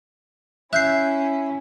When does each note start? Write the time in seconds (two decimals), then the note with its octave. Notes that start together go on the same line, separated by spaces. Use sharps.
0.73 C#4 E4 E5 F#6 G6 C7